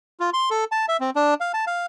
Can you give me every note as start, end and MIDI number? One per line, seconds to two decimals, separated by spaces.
0.20 0.30 65
0.33 0.49 84
0.50 0.64 69
0.72 0.86 81
0.88 0.97 76
1.00 1.10 60
1.16 1.34 62
1.41 1.52 77
1.54 1.65 81
1.67 1.86 77